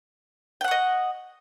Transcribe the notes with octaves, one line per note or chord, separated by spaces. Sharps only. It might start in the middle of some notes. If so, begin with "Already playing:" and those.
D#5 F#5 G5 C#6